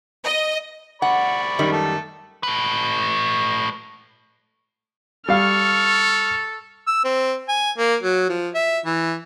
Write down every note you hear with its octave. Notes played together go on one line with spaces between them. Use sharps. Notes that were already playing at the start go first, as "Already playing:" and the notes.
D#5
D5 F#5 B5 C#6
F#2 D#3 G3
A3 A4
A3 B4
G3 A4 F5 C#6 F6
E6
C4
G#5
A#3
F#3
F3
E5
E3